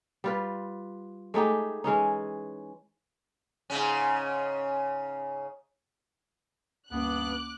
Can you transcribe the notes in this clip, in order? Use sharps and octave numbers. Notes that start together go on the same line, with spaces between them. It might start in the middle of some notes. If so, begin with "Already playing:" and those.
G3 F4 B4
G#3 A3 D#4 G4
E3 G#3 C#4 D#4
G#2 C#3 C#4
D2 G2 A#3 B3 C#4 D6 F#6